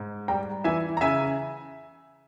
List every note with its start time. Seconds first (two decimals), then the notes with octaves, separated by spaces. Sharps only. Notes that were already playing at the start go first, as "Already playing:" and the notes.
Already playing: G#2
0.28 G3 G5 A#5
0.64 E3 E5 G#5
0.97 A#5
1.01 C#3 E5 G#5